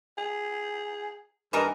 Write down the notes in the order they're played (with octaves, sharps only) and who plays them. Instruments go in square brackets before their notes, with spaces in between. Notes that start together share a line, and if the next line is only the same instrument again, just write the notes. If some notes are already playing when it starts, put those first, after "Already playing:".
[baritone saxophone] G#4
[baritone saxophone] G2 [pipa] E3 D#4 A#4 [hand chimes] D#5 G#5